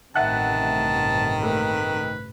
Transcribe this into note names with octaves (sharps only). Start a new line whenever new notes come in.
A1 G2 C3 D#3 E5 F#5 A5 F#6
A3 A#3 B4